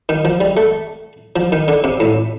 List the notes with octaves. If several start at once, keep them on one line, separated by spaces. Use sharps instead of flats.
D#3
F3
G3
A3
F3
D#3
D3
C3
A2